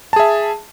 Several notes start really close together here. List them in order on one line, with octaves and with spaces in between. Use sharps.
A5 G#4 E5